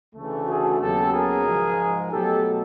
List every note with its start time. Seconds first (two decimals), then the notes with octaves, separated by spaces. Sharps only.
0.14 D2 C#3 E3 A3
0.47 F#4 G#4
0.80 D#2 C#3 F#3 B3 G4 A4
1.13 G#4 A#4
1.45 G#2 F3 G#3
2.11 B2 F#3 A3 G4 A4